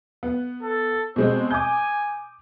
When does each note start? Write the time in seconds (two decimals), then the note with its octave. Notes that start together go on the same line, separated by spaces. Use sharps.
0.23 B3
0.62 A4
1.16 B2 G#3 C4 C5
1.50 G#5 D6 D#6 G6